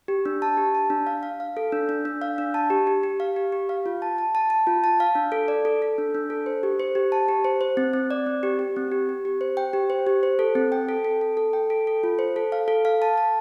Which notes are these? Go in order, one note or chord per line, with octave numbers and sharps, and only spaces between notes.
G4
D4
A5
G4
A5
D4
F5
F5
F5
A4
D4
D4
D4
F5
D4
A5
G4
G4
G4
F5
G4
G4
F5
F4
A5
A5
A5
A5
F4
A5
F5
D4
A4
D5
A4
A4
D4
D4
A4
C5
G4
C5
G4
A5
G4
C5
C5
C4
C4
D5
C4
G4
G4
C4
G4
G4
G4
C5
G5
G4
C5
G4
C5
A4
C4
G5
A4
A4
A4
A4
G5
A4
A4
F4
C5
A4
F5
A4
F5
A5
A5